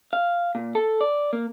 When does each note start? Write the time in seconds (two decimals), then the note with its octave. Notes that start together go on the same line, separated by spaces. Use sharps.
0.13 F5
0.55 A#2
0.75 A4
1.01 D5
1.33 A#3